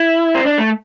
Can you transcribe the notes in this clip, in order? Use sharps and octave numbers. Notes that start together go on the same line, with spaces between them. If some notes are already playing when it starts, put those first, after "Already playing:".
Already playing: E4
C4
D4
A3